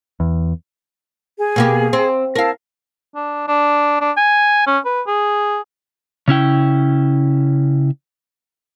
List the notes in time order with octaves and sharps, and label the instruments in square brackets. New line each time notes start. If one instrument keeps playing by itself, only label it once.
[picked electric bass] E2
[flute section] G#4
[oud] B2 A#3 G4
C4
[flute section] E4 A5 [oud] A#4 F5
[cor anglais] D4
D4
D4
G#5
C#4
B4
G#4
[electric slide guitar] C#3 C#4 E4 G5